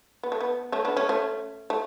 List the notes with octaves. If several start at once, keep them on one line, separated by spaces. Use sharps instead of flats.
B3
A3
B3
A3 C#4
B3 D4
A3 C#4
A3 C#4
A3